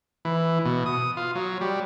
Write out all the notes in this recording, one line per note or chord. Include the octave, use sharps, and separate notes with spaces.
E3
B2
D#6
F4
F#3
G3